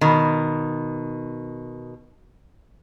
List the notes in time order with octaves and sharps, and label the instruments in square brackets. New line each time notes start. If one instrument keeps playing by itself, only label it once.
[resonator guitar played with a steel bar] B2 D#3